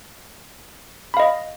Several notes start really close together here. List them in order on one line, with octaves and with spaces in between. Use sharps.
B5 F5 D#5